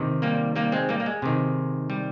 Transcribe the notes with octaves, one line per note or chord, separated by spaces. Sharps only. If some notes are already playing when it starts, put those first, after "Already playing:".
Already playing: C3 D#3
G3 A#3
G3 A#3
G#3 C4
G3 A#3
A#3
G#3
C3 D#3
G3